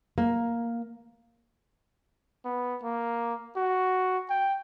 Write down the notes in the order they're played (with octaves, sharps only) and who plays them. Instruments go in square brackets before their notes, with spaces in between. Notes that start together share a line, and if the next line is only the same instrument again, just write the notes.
[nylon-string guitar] A#3
[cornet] B3
A#3
F#4
G5